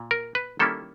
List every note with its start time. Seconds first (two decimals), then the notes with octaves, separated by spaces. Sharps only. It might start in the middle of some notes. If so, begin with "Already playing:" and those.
Already playing: A#2
0.11 A#4
0.35 B4
0.59 D#3 G3 A#3 C#4 E4 A4